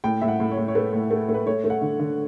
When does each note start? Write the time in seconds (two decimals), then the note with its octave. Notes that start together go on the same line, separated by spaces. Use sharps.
0.04 A2 G5
0.22 A2 E5
0.28 F#5
0.40 A2
0.51 C#5
0.57 A2
0.68 C#5
0.75 A3 B4
0.93 A2
1.11 A3
1.29 A3
1.34 B4
1.46 A3 C#5
1.64 A3
1.70 F#5
1.82 D3
2.00 D3